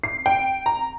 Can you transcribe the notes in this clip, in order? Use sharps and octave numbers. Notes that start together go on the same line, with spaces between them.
C7
G5
A#5